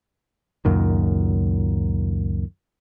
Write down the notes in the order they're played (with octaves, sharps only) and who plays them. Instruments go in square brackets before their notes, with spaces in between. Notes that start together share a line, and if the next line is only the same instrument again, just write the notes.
[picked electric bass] C#2 F#2 A#2 D#3